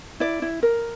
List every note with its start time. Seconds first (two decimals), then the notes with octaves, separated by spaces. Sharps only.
0.20 E4 D5
0.42 E4
0.63 A#4